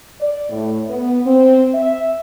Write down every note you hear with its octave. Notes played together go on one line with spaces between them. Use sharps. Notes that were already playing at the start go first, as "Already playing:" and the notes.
D5
A2
B3
C4
E5